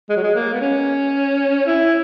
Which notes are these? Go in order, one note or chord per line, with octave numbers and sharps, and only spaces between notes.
G#3
F#3
G#3
A#3
B3
C#4
E4